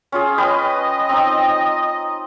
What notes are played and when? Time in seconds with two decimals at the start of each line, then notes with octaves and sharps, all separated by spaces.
0.12 C#4 F4 G#4
0.38 B4 D#5 G5 G#5
1.09 C4 D#4